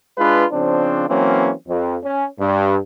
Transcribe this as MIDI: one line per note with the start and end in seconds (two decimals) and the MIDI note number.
0.18 0.45 56
0.18 0.45 62
0.18 0.45 65
0.18 0.45 71
0.52 1.07 49
0.52 1.07 53
0.52 1.07 60
0.52 1.07 62
1.09 1.52 52
1.09 1.52 54
1.09 1.52 58
1.09 1.52 60
1.09 1.52 61
1.67 1.97 41
2.04 2.26 61
2.40 2.77 43